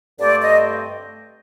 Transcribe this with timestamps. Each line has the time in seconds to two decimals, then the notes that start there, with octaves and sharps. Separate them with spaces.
0.19 G2 D3 A3 C4 D5
0.42 D#5